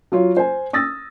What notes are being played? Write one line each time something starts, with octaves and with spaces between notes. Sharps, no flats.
F#3 F4 C#5
C5 G#5
D#6 E6 A6 A#6